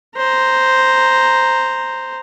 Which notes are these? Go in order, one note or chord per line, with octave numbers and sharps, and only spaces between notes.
C5 A#5